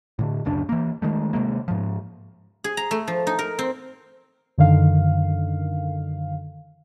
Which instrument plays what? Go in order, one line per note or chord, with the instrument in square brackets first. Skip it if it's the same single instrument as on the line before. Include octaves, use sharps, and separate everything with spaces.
[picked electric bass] A2 D3
D1 F#2 C#3 D4
E3 A#3
D#3 G#3 A3
C3 E3 G#3 A#3
G#2 F3
[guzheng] G#4
A#5
A3
F3
D#4
A#4
C4
[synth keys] F#2 D3 D#3 F5